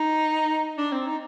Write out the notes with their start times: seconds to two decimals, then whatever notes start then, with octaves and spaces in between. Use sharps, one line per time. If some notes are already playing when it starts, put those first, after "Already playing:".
Already playing: D#4
0.78 D4
0.92 C4
1.06 D#4